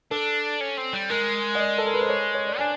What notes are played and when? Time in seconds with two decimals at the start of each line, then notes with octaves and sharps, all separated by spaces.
0.11 D4 A4
0.60 C#4
0.77 C4
0.93 G3
1.10 G#3 A#4
1.55 D#5
1.60 D5
1.78 A4
1.86 A#4
1.94 B4
2.01 C5
2.09 C#5
2.34 C#5
2.47 D5
2.59 D4 G#5